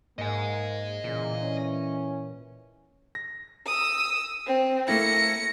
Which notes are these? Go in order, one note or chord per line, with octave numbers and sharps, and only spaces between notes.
G#2 A#3 D#5 G#5
A#2 C#3 E3
C#4
A#6
D#6 E6
C4
A3 A#3 E4 A#6 C#7